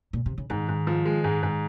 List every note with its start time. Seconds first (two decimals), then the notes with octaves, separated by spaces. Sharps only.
0.13 A#2
0.26 C3
0.38 C#3
0.50 G#2 D#3
0.69 G#2
0.87 F3
1.05 G#3
1.24 G#2
1.43 G#2